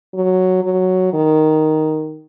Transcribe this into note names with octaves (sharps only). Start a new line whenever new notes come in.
F#3
F#3
D#3